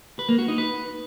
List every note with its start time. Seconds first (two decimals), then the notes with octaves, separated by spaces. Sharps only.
0.19 B4
0.29 A#3
0.38 F#4
0.48 D#4
0.58 B4